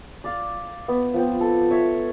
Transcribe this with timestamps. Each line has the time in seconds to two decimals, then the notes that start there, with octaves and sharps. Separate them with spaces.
0.24 D5 F5
0.88 B3
1.14 F3 B3 C4
1.41 A4
1.71 C#5 E5